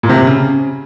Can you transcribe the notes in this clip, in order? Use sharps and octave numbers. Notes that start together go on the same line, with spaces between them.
A#2
C3
C#3